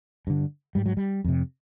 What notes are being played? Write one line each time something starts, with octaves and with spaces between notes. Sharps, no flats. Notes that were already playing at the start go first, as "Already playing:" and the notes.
G2 D3
G#2 G3
F#3
G3
F2 C3